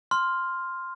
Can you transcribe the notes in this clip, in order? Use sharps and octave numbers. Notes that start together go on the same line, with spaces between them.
C6 F6